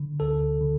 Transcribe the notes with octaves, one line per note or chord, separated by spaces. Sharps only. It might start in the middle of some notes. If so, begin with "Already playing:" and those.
Already playing: D3
D2 A4
D3